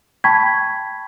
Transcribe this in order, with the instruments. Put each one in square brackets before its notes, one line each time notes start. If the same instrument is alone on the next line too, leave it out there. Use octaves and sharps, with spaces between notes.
[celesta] G5 A5 B5 C#6 G#6 B6